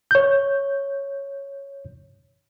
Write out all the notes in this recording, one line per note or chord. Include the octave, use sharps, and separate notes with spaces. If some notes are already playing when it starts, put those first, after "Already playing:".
C#5 G6